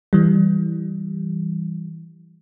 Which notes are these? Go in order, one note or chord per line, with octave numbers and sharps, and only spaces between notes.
E3 G3